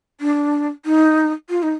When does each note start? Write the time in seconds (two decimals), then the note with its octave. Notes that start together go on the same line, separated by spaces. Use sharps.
0.21 D4
0.85 D#4
1.50 F4
1.63 D#4